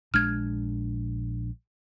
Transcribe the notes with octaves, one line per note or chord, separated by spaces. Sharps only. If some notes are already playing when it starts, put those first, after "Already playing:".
A#1 G#3 D4 F6 G#6